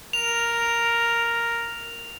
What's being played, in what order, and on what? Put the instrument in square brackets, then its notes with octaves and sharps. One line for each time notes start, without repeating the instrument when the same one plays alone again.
[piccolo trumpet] A#4 [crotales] F7